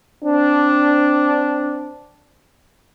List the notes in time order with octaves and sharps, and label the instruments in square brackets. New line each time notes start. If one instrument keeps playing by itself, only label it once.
[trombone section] C4 D4